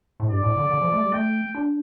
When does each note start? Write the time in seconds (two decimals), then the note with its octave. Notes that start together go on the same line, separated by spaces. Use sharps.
0.20 A2
0.29 G2 D5
0.43 A2
0.57 D3
0.71 D3
0.81 F3
0.93 A3
1.02 G3
1.13 A3 G5
1.55 D4